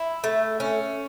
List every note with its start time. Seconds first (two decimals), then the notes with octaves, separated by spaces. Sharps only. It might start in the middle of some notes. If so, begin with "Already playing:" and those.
Already playing: E4
0.24 A3
0.60 C#4